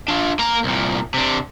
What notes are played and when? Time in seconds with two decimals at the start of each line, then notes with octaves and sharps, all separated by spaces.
0.08 D4 F4
0.39 A#3 A#5
0.64 C2 A#2
1.14 C3 D4